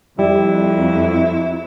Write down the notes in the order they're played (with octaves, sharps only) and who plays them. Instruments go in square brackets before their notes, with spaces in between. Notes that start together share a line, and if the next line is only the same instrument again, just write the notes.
[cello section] F2 [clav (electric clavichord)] G3 [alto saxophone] E4